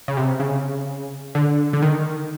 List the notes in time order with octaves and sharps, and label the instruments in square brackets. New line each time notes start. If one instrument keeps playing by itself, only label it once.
[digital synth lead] C#3
C3
C#3
D3
D3
D#3